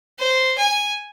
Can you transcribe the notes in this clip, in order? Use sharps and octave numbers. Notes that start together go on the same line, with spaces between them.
C5
G#5